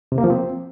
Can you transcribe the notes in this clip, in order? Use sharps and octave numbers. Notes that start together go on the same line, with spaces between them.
C3
A#3
F3
C4